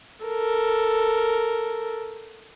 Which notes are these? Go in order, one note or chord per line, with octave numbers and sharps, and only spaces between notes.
A4 A#4